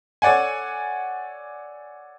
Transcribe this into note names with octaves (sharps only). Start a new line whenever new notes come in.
A4 C#5 D5 F#5 G#5